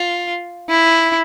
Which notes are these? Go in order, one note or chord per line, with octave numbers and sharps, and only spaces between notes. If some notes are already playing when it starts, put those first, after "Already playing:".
Already playing: F4
E4